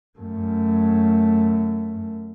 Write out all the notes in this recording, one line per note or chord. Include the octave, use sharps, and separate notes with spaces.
F#2 A3